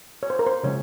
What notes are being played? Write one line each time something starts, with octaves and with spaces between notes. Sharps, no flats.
C#5
C5
A#4
C5
C#3 F3 G#3 C#4 C#5